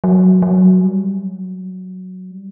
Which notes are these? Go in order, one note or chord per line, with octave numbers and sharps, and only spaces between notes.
F#3
F#3
G3
F#3
G3